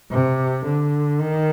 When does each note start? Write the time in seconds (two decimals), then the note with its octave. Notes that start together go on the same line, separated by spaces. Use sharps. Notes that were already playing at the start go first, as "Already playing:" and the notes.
0.11 C3
0.65 D3
1.20 D#3